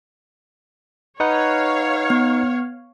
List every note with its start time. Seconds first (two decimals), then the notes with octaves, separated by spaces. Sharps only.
1.20 D#4 B4 C#5 F5 F#5
2.10 B3